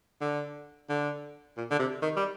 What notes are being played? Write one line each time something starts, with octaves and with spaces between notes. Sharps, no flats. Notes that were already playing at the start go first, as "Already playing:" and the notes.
D3
D3
A#2
D3
C3
D#3
G3